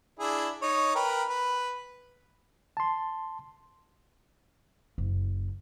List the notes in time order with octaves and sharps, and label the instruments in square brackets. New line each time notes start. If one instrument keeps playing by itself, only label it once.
[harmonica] D4 E4 G#4
D#4 C#5
A#4 B4 G5
B4
[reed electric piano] A5 C6
[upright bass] F#1